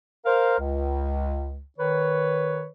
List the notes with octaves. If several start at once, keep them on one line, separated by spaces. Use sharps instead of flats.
A#4 C5 F5
C#2
D#3 B4 C#5